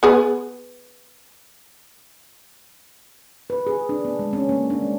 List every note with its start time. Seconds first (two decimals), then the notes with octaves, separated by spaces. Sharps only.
0.03 B3 G#4 B4
3.50 B4
3.67 G#4
3.89 D4
4.05 B3
4.19 G#3
4.33 C#4
4.49 A#3
4.70 D4
4.82 G#3